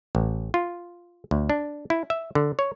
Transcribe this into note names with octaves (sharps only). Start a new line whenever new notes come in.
A1
F4
D2
D4
E4
E5
D3
C#5